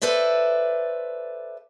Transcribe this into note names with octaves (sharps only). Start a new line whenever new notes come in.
A4 B4 C5 D5 E5